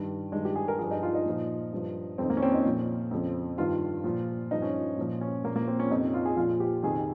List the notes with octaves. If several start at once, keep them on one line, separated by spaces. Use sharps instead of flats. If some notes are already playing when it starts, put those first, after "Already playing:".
Already playing: G2 D#3 G3
G2 D#3 G#3
G4
G#4
A#4
G2 F3 G#4
D#4
F4
D#4
A#2 F3
G2 F3
F2 D#3 C4
A#3
C#4
C4
D#4
A#2 F3
F2 C#3 F3
G2 D#3 F4
A#2 F3
G2 F3 D#4
C#4
A#2 F3
C#4
A#2 F3 A#3
A#3
C4
C#4
F2 C3 F3 D#4
F4
G#4
A#2 F3 F4
G4
F2 C3 D#3 G#4